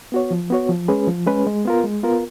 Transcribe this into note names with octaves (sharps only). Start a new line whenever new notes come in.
B3 F#4 C#5
F3
B3 F#4 C#5
F3
G#3 C#4 G#4 B4
F3
G#3 C#4 G#4 B4
G#3
B3 F4 A#4
G#3
B3 F4 A#4